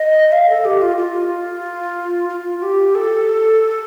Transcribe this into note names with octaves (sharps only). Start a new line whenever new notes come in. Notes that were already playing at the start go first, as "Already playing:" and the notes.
Already playing: D#5
F5
A4
G4
F4
F4
F4
G4
A4